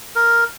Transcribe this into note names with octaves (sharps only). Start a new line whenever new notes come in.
A#4